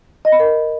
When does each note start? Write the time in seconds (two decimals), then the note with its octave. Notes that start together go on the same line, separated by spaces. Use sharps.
0.25 D#5
0.32 B5
0.40 A#4